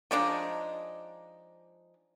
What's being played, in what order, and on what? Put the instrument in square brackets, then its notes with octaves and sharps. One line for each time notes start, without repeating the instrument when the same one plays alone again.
[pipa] F3 G#3 D4 D#4